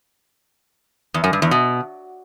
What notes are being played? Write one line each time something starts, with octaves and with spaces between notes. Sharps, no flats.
E2
F#2
G2
E2
B2